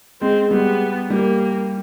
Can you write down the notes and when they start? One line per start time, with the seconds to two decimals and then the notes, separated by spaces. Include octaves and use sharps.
0.21 G#3 C4
0.51 G3 B3
1.10 G3 A#3